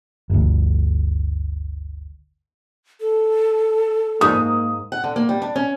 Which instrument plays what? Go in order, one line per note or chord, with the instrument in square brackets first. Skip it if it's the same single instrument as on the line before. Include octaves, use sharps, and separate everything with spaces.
[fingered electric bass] G1 D2
[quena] A4
[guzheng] G#2 [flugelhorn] A#3 [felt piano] D#6
[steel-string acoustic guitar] F#5
D3
A#3
G3
D4
C#4